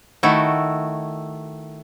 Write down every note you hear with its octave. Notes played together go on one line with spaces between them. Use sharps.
D#3 A3 E4 F#4